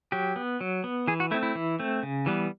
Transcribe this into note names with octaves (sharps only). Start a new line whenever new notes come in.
F#3 G4
B3
F#3
B3
E3 G#4
F#4
A3 C4 E4
E4
E3
A3 C4
C#3
E3 G3 B3